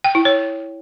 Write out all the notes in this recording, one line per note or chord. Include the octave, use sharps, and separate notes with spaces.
G5
E4
C#5